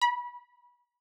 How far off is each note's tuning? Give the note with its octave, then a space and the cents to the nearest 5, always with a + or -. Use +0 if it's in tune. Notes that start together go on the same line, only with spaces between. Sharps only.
B5 -25